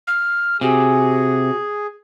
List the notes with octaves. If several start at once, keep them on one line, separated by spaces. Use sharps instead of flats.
F6
C3 F#4 G#4